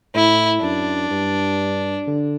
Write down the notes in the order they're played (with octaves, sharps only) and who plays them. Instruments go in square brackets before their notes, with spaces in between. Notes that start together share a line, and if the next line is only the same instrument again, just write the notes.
[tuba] A2 [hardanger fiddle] E4
[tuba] F#2 [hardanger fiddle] D4
[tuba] G2
D3